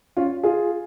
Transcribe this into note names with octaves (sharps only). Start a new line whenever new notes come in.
C#4 F4
F4 G#4